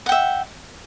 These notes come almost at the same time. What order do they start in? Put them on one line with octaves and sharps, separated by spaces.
F#5 G5 E5